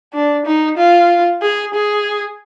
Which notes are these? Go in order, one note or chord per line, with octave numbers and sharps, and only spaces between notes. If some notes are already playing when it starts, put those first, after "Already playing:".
D4
D#4
F4
G#4
G#4